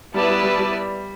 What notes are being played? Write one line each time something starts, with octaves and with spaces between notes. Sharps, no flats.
G3 B3 E4 B4 D5 A5
G3
G3
G3